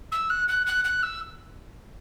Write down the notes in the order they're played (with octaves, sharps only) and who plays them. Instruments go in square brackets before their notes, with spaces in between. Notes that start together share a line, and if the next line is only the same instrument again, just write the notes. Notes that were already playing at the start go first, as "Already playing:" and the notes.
[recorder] E6
F#6
F#6
F#6
F#6
E6